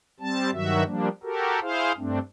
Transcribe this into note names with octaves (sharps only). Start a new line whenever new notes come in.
G3 C4 A5
G2 D#3 F#3 F#4 E5
F3 G3 A#3 D4
F#4 G4 A4 A#4
E4 G#4 C5 F5
G2 A3 C4 D4